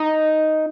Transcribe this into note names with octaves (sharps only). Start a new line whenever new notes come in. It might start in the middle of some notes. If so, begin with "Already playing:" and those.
Already playing: D#4